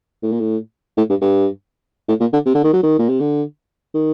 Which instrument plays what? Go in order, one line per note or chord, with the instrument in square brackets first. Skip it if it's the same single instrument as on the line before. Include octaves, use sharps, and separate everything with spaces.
[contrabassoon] A2
A#2
A2
A2
G2
G2
A2
A#2
D3
C3
D3
D#3
F#3
D#3
A#2
C3
D3
D#3